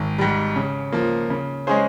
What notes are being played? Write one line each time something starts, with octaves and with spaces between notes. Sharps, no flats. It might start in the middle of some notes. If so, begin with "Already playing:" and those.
Already playing: G#1
G#2 G3
C#3
F3 A#3
C#3
G#3 C#4 G#4 C5